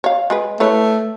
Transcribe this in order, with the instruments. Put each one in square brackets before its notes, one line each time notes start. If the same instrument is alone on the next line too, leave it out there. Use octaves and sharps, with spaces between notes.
[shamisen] C#5 F5
G#3 G#4 B4
[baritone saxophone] A3 [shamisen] E4 B4 C#5